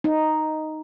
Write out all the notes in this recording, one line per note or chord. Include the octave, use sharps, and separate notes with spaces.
D#4